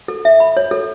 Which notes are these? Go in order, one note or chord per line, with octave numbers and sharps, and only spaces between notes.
A4
E5
B5
C#5
A4